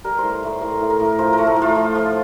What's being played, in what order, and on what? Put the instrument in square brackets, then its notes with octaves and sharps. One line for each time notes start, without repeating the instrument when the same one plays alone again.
[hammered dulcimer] G3 A#4
A2 C5
A2 C5
A2 A#4
A2
A#4
A2
A#4
F3 C5
A#4
A3
A4
A2
F4
A2
F3